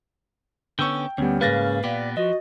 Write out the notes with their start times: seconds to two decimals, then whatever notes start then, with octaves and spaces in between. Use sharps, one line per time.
0.79 D3 B3 C#4 G5 C#6 E6 G6
1.18 D2 G3 B3 C#4
1.41 G#2 C#3 A#3 B4 F5 A6 A#6
1.84 A#2 B3 G4 D5
2.17 F3 F#4 D#5